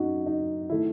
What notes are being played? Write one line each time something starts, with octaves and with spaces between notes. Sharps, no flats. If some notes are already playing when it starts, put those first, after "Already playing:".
Already playing: F#2 A3 D#4 F#4
D#4
D#3 A3 E4